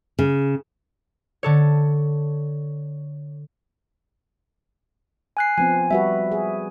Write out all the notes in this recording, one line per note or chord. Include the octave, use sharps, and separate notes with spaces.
C#3
D3 A4 C#5
G#5 F#6 C7
F3 B3 C4 G#5
G3 F#4 B4 E5
G#4